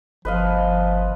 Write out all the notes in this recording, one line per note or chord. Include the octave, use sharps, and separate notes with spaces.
G1 F3 B4 D#5 F5